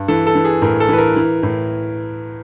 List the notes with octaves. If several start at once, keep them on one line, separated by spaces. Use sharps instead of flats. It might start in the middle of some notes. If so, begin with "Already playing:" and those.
Already playing: G2
E3 A4
A4
E3
G#4
A2 A#4
A4
E3 B4
A#4
E3
A2